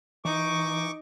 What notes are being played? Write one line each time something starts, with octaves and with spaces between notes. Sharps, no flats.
E3 D#4 C#6 D6